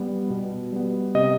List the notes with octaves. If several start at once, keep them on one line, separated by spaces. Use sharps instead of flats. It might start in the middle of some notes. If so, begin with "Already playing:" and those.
Already playing: G3 B3
B2
G3 B3
C3 D#5